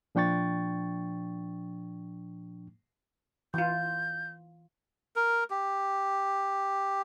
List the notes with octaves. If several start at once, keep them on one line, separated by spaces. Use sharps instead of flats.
A#2 F3 D4 G5 C#6 A6
E3 F4 G6
A#4
G4